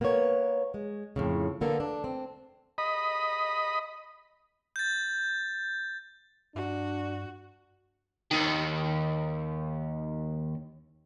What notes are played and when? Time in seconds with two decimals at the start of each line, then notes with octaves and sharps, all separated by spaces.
0.01 A#3 B3 A#4 C5 C#5
0.74 G#3
1.16 F2 A2 C#3
1.61 D3 A#3 B3 A4
1.80 D4
2.04 C4
2.78 D#5 B5
4.76 G6 A6
6.55 G2 D4 F#4
8.31 D#2 D#3